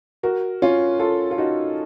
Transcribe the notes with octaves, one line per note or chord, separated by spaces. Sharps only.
F#4 A#4
C#4 F4
F4 A4
F4
D#4 F#4